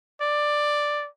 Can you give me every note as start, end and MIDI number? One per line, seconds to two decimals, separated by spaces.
0.21 1.08 74